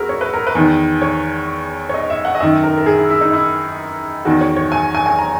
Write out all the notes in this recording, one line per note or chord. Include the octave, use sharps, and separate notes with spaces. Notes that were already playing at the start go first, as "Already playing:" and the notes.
Already playing: E2 E4 F#4 G#4 A#4
C#5
B4
A#4
B4
E2 D#3
C#5
C#5
D#5
E5
F#5
D#5
F#2 D#3 E5
A#4
A#4
G#4
E4
E4
D#4
E4
E2 D#3 F#4
C#5
C#5
G#5
G#5
G#5
A#5